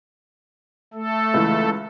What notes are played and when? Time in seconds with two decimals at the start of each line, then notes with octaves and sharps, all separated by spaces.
0.94 A3 A4
1.34 C#2 E3